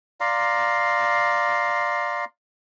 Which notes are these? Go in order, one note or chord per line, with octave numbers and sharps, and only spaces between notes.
D5 F5 A#5 C6